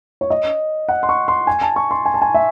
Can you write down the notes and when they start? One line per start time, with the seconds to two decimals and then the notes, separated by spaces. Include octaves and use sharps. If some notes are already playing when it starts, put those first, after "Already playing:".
0.21 C#5
0.30 D#5
0.88 F#5
1.03 C6
1.09 C#6
1.28 C6
1.47 G#5
1.61 A5
1.76 C#6
1.91 C6
2.06 G#5
2.14 A5
2.22 G#5
2.34 E5